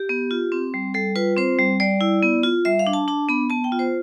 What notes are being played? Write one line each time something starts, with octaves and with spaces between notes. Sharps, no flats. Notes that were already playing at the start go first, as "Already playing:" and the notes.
Already playing: G4
B3
F4
C4
G3
G3 A4
F4 B4
C4 C5
G3
G3 D5
E4
B3
F4
G3 E5
F5
D4
A5
D4 A5
B3 B5
B3 A5
G5
F4
C5